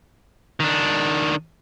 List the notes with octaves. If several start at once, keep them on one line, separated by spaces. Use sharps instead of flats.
D#3 D4